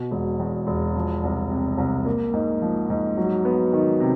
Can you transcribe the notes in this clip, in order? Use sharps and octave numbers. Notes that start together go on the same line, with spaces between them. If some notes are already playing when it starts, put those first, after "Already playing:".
Already playing: B2
E1
E2
E1
F3
C2
C3
C2
A#3
G#2
F3
G#2
F#3
B3
D#3
C3